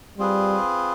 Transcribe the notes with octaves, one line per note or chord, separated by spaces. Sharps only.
G3 C4 F4 G#4 B4